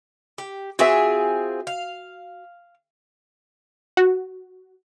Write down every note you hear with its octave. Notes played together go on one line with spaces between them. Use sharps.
G4
C4 F4 F#4 G#4 E5
F5
F#4